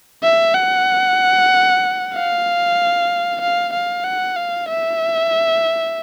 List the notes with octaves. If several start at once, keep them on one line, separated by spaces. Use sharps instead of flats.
E5
F#5
F5
F5
F5
F#5
F5
E5